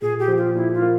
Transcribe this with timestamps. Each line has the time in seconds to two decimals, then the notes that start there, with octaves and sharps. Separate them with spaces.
0.02 A#2 G#4
0.19 G4
0.28 F3
0.38 F4
0.55 A#2 E4
0.74 F4
0.82 A#3